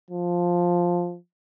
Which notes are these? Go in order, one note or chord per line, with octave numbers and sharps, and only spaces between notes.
F3